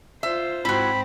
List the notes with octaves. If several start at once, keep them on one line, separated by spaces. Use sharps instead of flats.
F4 C5 E5
G#2 C4 E4 F#4 B5